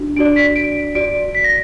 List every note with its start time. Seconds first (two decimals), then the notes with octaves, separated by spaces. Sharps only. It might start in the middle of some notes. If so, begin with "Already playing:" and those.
Already playing: D4 F#4
0.16 D4 F#4 D5 D7
0.36 B6
0.56 D7
0.95 F#4 D5 D7
1.35 B6
1.44 A#6